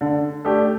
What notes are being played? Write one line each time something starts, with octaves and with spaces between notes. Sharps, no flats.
D3
A3 D4 G4